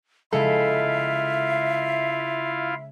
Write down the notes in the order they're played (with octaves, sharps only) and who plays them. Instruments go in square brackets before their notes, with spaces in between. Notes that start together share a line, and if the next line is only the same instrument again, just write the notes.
[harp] C#3 G#3 [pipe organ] E4 F4 F5 [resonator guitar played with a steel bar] A4 [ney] E5